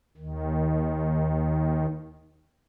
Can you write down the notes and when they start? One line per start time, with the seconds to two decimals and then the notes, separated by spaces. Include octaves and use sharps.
0.17 D#2 D#3